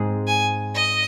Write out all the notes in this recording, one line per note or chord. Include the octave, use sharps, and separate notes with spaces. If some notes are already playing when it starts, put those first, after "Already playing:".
Already playing: G#2 G#3 C4 G#4
G#5
D#5